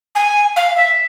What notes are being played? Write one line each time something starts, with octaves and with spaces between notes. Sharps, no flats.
G#5
F5
E5